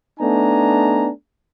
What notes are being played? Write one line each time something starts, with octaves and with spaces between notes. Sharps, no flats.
A3 B3 D4 D#4 G#5 A#5